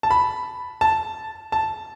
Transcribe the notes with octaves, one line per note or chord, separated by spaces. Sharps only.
A5
B5
A5
A5